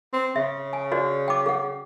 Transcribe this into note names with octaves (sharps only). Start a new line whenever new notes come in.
C4
C#3 E5
G#5
F#4 C5 D5
G5 D6
G#4 F#5